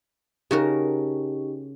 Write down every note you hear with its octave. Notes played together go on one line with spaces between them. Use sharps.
C#3 D#4 F#4 G4 A#4